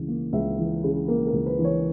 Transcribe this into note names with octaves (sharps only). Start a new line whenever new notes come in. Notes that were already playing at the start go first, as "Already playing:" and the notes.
Already playing: C#2 C#3 E3
A#3
C#2 E5
E3
C#3
A#3 A#4
A#4
C#2
B4
E3
C#5